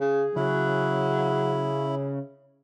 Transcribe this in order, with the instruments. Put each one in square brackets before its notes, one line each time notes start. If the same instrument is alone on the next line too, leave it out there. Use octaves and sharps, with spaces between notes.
[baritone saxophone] C#3 [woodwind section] G#4
[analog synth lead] C#3 [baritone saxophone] F#3 [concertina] E4